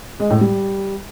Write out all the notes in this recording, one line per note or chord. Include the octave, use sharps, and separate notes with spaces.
G#3
A2
G3